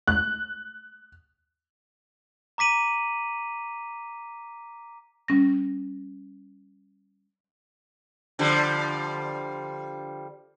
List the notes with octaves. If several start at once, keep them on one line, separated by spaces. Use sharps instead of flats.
F#6
A#5 D6 B6 D#7 F#7
G3 C#4 A#6
D3 F3 G3